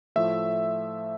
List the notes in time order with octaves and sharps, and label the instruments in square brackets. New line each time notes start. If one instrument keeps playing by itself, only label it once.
[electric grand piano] A2 F3 A3 E5